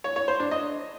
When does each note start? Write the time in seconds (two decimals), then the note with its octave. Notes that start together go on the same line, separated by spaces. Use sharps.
0.04 C#5
0.16 C#5
0.28 C5
0.40 D4
0.51 D#5